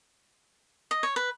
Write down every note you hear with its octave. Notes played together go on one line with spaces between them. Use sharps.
D#5
C#5
B4